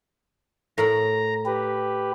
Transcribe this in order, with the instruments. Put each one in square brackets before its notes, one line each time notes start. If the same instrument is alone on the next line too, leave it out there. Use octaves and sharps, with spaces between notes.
[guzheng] A2 A#4 B5 [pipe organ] A#5
[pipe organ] G4 B4